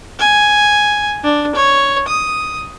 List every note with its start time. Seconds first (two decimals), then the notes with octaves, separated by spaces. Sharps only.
0.20 G#5
1.24 D4
1.55 C#5
2.08 D#6